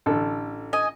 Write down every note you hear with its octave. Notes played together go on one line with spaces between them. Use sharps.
A1 D3 A4
D#5 G#5